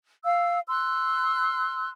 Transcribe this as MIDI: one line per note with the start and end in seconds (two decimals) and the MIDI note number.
0.24 0.58 77
0.24 0.58 88
0.68 1.89 84
0.68 1.89 88
0.68 1.89 90